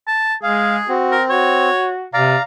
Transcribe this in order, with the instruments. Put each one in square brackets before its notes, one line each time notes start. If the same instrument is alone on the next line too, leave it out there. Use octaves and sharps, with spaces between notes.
[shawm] A5
[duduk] G#3 [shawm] G#4 [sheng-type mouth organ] F5
[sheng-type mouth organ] C4 [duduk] F#4
[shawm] A#4
[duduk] F#4 [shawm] C#5
[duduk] C3 [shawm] D5 [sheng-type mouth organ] F5 A#5